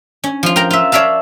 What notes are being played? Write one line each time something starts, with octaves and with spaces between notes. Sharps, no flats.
C#4
F3 F4
A#4 G5 A#5
F4 E5
C#5 D5 E5 F5 A5